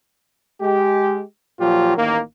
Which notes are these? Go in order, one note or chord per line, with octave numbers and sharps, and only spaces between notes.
G#3 G4
A#2 F3 F#3 F4 G4
A1 D#3 A#3